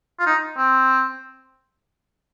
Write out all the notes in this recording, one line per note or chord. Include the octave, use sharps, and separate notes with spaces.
F4
D#4
C4